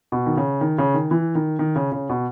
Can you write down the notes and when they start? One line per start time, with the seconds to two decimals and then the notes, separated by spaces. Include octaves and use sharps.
0.12 B2
0.26 D#3
0.37 C#3
0.61 D#3
0.78 C#3
0.94 D#3
1.11 E3
1.35 D#3
1.59 D#3
1.76 C#3
1.92 C#3
2.09 B2